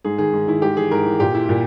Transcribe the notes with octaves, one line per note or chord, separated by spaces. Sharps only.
G#2 G#4
D#3 G#4
G#2
D#3 E4
G#2 G4
E3 G#4
G#2 A#4
E3
A#2 G4
E4
A#2 E4